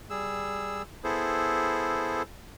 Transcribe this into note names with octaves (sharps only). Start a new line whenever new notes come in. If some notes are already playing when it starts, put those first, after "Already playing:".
G3 G#4 E6
B3 E4 G#4 A4 C5